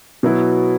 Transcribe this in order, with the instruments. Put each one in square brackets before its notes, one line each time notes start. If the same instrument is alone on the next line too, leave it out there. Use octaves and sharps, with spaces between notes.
[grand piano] B2 F#3 B3 E4